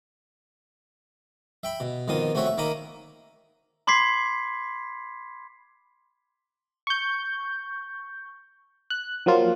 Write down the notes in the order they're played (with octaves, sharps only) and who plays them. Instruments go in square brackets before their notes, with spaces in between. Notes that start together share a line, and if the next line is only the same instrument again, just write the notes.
[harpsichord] E5 G5 B5
B2
F2 B2 D#3 F4 D#6
A3 C4 F#4 C#5 E5
E5
D#3 A#3 A#4 B5 D#6
[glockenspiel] B5 C6 D6 G#6 B6 C7
[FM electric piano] C#6 G6
F#6
F3 F#3 A#3 F4